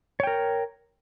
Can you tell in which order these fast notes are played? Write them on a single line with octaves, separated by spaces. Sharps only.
C#5 G5 A#4